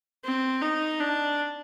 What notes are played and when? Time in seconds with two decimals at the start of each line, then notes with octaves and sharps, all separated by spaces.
0.24 C4
0.62 D#4
1.00 D4